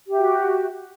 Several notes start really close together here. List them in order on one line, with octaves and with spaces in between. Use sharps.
G4 E5 F#4